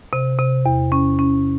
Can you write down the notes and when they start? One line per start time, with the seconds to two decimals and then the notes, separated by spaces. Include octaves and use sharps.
0.13 C3
0.39 C3
0.66 E2
0.92 C#4
1.19 C#4